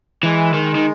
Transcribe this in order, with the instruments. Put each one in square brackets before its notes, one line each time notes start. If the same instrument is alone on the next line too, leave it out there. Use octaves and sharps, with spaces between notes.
[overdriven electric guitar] E3 [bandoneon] G#3
[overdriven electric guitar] D#3
D#3